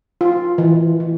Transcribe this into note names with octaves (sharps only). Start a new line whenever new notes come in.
F4
E3
E3